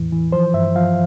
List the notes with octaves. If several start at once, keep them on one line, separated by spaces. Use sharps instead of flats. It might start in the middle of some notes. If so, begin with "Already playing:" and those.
Already playing: E2 A2 E3
E3
F3 C5
G2 E5
F3 F5